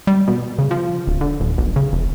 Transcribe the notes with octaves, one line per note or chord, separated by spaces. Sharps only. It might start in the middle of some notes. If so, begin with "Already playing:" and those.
G3
B2
C#3
F3
D1
D3
D#1
B1
C#3
F1